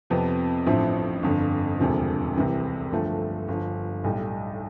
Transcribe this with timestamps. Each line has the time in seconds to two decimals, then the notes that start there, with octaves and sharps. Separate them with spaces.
0.10 F2 C3 F3 B3
0.67 A1 G2 F3 C4 E4
1.23 G1 F2 D3
1.79 E1 D2 C3 F3
2.35 C2 C3 E3
2.92 G1 G2 F3 A3
3.48 G1 G2 F3
4.04 B1 A2 G3